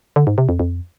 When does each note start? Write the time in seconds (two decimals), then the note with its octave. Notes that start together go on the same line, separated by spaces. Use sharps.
0.16 D3
0.27 G#2
0.38 C3
0.49 F2
0.59 F2